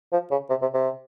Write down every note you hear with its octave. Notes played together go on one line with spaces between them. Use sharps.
F3
C#3
C3
C3
C3